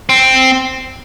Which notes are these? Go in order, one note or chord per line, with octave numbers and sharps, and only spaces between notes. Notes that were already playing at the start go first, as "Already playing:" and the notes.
C4